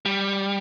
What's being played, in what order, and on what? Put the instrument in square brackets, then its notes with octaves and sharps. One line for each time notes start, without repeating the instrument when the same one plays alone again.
[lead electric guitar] G3